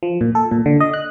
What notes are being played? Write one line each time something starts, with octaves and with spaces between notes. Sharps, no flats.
F3
A#2
A4
A#2
D3
D#5
F#6